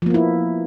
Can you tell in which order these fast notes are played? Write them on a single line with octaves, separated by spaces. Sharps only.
F3 A#3 B3 E4